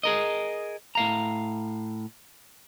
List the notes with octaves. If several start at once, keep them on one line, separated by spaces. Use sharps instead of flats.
G#4 A#4 D#5
A2 F5 A#5